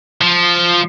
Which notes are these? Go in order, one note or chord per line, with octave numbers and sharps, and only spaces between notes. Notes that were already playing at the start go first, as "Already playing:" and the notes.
F3